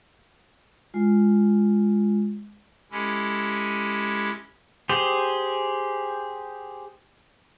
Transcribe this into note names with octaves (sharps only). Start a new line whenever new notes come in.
G#3 F4
G#3 C#4 E4 G4 A4
G4 G#4 C5